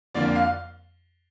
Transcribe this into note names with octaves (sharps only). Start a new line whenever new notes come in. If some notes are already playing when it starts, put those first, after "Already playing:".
F2 D3 A#3 D4 F4 D5
F5